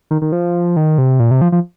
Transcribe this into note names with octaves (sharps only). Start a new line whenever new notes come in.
D#3
D#3
F3
D#3
C3
A#2
C3
F3
F3